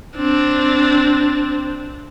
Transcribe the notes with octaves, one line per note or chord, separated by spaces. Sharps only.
C4 D4